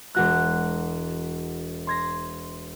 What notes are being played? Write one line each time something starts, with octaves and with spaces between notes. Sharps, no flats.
E1 F#4 F#6
C6 G#6 A#6